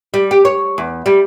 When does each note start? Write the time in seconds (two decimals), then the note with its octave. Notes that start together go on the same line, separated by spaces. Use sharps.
0.14 G3
0.31 G4
0.45 C#5
0.78 E2
1.06 G3